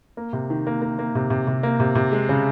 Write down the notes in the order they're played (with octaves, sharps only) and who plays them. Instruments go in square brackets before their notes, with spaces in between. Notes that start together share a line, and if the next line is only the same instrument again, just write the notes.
[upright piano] A#3
C3
D#3
A#3
A#3
A#3
C3
C3
C3
A#3
C3
C3
G#3
C#3